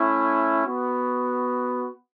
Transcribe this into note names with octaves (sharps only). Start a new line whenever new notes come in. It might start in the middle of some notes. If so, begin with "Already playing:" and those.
Already playing: A3 C#4 E4
B3 F#4